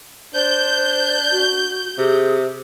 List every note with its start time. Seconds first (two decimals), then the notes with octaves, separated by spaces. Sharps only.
0.35 D4 C5 G6
1.32 F#4
1.98 C3 G#4